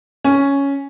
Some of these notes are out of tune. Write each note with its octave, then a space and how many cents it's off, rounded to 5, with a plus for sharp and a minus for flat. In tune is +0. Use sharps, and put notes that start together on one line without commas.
C#4 +5